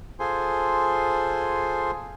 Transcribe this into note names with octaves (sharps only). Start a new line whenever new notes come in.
F4 G#4 A4 C5 G#5 C6